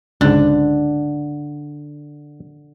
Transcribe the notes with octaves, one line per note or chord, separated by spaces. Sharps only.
C#2 G#2 D3